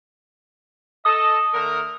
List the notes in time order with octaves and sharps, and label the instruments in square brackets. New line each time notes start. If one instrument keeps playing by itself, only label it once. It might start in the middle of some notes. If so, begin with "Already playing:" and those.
[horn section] A4 D#5 [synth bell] D#6
[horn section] D3 A3 A#4